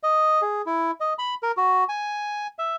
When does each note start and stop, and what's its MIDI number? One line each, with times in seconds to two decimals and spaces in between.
0.03 0.42 75
0.42 0.62 68
0.66 0.91 64
1.00 1.14 75
1.19 1.35 83
1.43 1.52 70
1.57 1.84 66
1.89 2.47 80
2.59 2.76 76